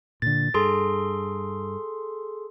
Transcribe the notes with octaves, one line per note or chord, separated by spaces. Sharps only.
A#2 D3 A6
G2 G#4 A4 C6